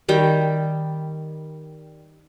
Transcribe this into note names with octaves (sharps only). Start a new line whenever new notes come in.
D#3 G3 G5